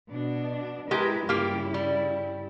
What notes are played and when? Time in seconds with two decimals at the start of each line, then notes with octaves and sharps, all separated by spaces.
0.11 B2 D4
0.91 G#3 E4 G4 A#4 B4
1.29 G2 C#3 A#3 E4 F4 G4
1.74 G3